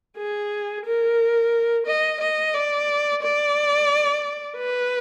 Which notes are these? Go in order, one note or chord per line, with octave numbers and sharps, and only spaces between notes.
G#4
A#4
D#5
D#5
D5
D5
B4